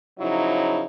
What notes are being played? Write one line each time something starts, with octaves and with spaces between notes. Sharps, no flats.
C#3 F3 F#3 D#4 E4